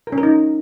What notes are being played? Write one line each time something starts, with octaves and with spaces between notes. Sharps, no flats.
A#4
C#4
A#4
D#4